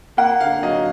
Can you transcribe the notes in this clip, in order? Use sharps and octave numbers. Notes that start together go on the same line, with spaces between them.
A#3 F#5
D3 F5
F#3 D#5